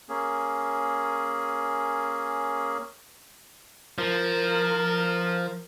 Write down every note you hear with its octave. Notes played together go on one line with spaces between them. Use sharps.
A#3 C#4 G#4
F3 A#4